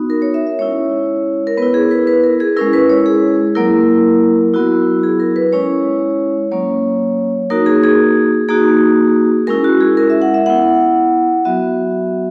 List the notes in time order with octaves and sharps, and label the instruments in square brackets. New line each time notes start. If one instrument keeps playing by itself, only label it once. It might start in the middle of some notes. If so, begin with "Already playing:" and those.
Already playing: [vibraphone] B3 D#4 F#4
A#4
C#5
E5
E5
G#3 C#4 E4 C#5
A#4
B3 E4 B4
G#4
B4
B4
A#4
G#4
G#3 C#4 E4 A#4
B4
C#5
G#4
F#3 A#3 E4 A#4
F#3 B3 E4 F#4
G#4
A#4
B4
G#3 C#4 E4 C#5
F#3 A#3 C#4 C#5
A#3 D#4 F#4 A#4
G#4
G#4
A#3 D#4 F#4 G#4
G#3 C#4 E4 A#4
F#4
G#4
A#4
E5
F#5
E5
B3 E4 F#5
F#3 B3 F#4 E5